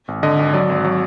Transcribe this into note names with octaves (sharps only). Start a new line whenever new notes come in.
G#1
D3 D#5
G#1
F#3 D5
G#1
F#3